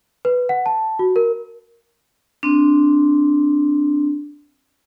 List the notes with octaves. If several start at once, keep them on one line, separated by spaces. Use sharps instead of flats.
B4
F#5
A5
F#4
A#4
C4 D4